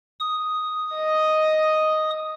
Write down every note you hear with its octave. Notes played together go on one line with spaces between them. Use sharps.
D#6
D#5